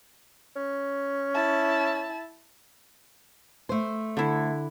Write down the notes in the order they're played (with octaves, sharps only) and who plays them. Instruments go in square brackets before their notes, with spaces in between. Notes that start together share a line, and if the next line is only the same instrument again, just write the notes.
[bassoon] C#4
[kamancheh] E4 A5
[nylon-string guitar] A3 C5
[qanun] D3 E4